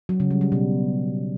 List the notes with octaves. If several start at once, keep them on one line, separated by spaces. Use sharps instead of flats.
F#3
C#3
G3
G3
B2